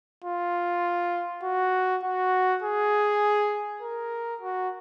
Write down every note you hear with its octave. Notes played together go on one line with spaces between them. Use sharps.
F4
F#4
F#4
G#4
A#4
F#4